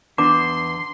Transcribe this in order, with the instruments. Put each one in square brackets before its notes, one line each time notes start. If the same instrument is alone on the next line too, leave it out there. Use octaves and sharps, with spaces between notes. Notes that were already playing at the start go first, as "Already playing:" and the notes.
[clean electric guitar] E2 B3 [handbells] D4 [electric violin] C6 C7 [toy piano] D6